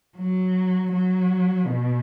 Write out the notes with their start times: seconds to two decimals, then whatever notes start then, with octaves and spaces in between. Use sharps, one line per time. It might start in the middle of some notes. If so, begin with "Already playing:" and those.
0.17 F#3
0.92 F#3
1.66 B2